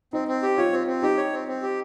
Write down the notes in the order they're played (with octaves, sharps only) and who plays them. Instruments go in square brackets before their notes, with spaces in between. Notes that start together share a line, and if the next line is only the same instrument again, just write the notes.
[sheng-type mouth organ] C4 [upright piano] D#4
[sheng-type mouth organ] C4
G4
[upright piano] F4 [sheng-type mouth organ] C#5
[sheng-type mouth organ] C4
C4
[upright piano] D#4 [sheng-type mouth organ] G4
[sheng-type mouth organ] C#5
C4
C4
G4